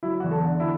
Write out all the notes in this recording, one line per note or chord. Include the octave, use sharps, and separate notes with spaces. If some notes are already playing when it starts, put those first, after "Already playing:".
F#3 E4
E2 F#4
A4
D3
E4